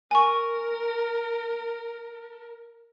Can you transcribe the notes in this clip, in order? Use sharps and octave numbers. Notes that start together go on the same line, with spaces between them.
A#4 G#5 C#6